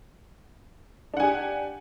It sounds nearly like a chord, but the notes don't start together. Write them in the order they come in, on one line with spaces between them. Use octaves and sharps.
D4 F#5 G#5 G4